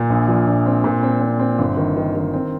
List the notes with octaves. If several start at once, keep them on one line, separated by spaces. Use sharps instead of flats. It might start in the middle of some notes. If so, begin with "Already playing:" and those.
Already playing: A#2
A#1
F3
A#1
C4
A#2
C4
C4
C4
G1
D#3
D#3
D#3
C4